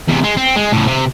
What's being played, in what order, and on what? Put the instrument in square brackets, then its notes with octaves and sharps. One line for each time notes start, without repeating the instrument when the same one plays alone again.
[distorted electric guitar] E2 C3
G#3
C4
G#3
A2 C#3
C3